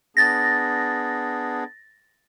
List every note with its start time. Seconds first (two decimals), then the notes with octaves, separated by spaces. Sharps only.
0.17 B3 D4 G#4 A6 A#6